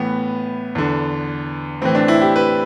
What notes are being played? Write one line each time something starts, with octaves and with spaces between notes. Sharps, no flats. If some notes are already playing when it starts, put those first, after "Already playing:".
Already playing: A2 E3 B3
E2 D3
A2 E3 C4
D4
E4
G4
B4